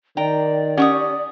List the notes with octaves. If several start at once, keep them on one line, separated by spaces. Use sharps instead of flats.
D#3 D5 G5 A#5
C#4 G4 F#5 C#6 D#6